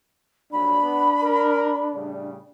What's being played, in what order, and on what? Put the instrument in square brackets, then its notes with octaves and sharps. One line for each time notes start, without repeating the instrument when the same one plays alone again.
[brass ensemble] A#1 D#2 F#3 [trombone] D4 [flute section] B5
[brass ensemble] B3
A#4
A2 C#3 G3